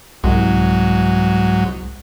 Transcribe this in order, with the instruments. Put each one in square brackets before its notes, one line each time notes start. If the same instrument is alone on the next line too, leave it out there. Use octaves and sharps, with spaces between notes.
[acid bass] C2 [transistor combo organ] G#2 F#3